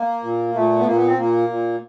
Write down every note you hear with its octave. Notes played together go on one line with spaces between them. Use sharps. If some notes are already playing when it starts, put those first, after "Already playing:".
Already playing: A#3
A#2
A#2 A3
B3
A#2 A#3
B3
C4
A#2 A#3
A#2